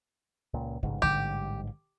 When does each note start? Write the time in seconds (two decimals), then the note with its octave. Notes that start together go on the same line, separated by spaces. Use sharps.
0.54 C#2 A#2
0.83 A1 G#2 C#3
1.02 D3 G3 G4